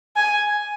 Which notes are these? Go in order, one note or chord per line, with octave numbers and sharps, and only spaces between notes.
G#5